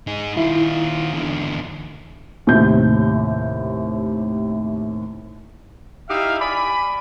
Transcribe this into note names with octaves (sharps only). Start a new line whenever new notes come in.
D#4 G#4
D#3 E4 F4
E2 D3
D#2 A2 C3 G6
D#4 E4 G4 E5 F5
D5 G#5 B5